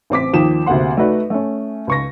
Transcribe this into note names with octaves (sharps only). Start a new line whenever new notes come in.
A1 C4 D6 B6
D#2 D#3 F3 G5 D#6 E7
D2 C3 A#3 F#5 C6
A3 D#4 F#4 B4 D5
A3 C#4
C#2 C#6 A#6